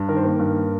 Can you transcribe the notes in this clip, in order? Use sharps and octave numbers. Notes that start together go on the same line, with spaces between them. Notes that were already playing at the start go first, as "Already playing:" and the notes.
Already playing: G2
D#3 A#4
C5
A#3 A#4
G2